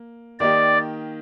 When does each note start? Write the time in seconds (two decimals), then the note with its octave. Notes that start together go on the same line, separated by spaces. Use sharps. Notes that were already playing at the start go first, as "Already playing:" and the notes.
Already playing: A#3
0.39 D#3 A#3 D#4 G4 D5